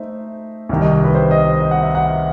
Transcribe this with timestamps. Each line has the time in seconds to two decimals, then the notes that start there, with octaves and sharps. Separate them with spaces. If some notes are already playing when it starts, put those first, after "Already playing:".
Already playing: A3 D#4 C5 E5
0.69 C2 C3 D#3
0.81 D#5
1.04 B4
1.15 C5
1.31 D#5
1.45 C5
1.61 D#5
1.71 F#5
1.83 E5
1.95 F#5